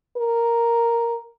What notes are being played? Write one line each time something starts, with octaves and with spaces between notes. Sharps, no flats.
A#4